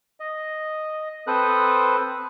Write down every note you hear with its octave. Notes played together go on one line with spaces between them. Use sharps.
D#5
C4 A4 B4 C5 D#6 F#6